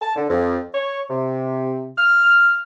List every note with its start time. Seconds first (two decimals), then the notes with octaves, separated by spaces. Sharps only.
0.01 A5
0.15 D3
0.29 F2
0.73 C#5
1.10 C3
1.97 F6